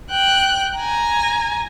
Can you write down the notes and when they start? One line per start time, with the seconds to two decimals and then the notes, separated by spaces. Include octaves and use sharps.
0.10 G5 F#6
0.78 G#5 A#5